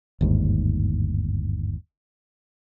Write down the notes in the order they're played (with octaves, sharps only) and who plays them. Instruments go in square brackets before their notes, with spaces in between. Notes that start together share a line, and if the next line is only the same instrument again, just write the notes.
[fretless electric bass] G1 D#2 G#2